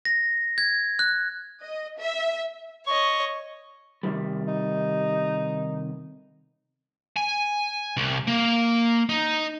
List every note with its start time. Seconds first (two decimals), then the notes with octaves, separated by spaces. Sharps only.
0.05 A#6
0.58 G#6
0.99 F#6
1.62 D#5
1.98 E5
2.86 C#5 D#5 C#6
4.03 C3 D#3 G3
4.48 D#4
7.17 G#5
7.97 C2
8.28 A#3
9.09 D#4